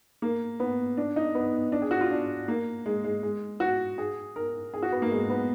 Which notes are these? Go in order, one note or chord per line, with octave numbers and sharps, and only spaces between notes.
A#3
B3
D4
D#4
B3
D4
G#4
F#4
F4
D4
A#3
G#3
G#3
G#3
F#4
G#4
A#4
G#4
F#4
B3
A#3
G#3
B3